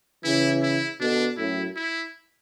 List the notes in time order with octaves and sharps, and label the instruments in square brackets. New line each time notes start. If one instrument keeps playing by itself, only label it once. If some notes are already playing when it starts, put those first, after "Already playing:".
[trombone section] C#3 E3 [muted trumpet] E4
[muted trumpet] E4
[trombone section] B2 D3 [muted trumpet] D4
[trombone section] F#2 A2 [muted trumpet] E4
[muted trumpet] E4